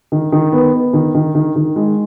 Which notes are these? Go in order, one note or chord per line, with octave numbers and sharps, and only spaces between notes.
D#3
D#3
B3
B3
D#3
D#3
D#3
D#3
G#3